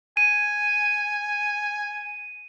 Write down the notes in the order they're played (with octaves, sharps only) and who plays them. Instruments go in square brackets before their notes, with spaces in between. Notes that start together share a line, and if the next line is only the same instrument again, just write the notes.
[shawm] G#5 [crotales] D#7